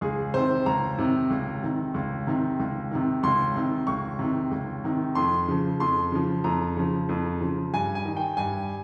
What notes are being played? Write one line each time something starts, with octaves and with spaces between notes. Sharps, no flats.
C#2 G#4
C3 D#3 C5
C#2 A#5
C3 D#3
C#2
C3 D#3
C#2
C3 D#3
C#2
C3 D#3
C#2 C6
C3 D#3
C#2 C#6
C3 D#3
C#2
C3 D#3
F2 C6
C#3 F3
F2 C6
C#3 F3
F2 A#5
C#3 F3
F2
C#3 F3
G2 G#5
G#5
D#3
G5
G2 G#5